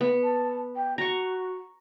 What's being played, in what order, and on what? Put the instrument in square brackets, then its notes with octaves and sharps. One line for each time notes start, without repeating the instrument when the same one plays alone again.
[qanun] B3
[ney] A5
G5
[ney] F#4 [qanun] A#5 C#6